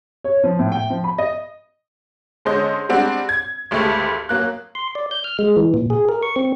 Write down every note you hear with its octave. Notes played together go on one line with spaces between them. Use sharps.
C#5
F3
A2
G5
F3
B5
D#5
D3 G#3 C#4 C5 D#5 G6
G3 G#3 C4 D4 F#4
G#6
G#1 D2 G#3 A3 G4
F#2 F#3 A#3 F#6
C6
D5
G6
F6
G#3
E3
A#2
G#4
A#4
C#6
C4